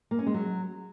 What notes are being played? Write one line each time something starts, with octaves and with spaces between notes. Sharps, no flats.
A#3
C#4
G#3
F#3